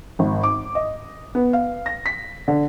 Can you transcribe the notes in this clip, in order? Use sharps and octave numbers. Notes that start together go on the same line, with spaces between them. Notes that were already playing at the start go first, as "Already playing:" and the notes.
G#1
D6
D#5
B3
F5
A#6
B6
D3